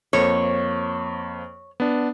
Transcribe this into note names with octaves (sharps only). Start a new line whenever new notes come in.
F2 A#3 C5 C#5
B3 D4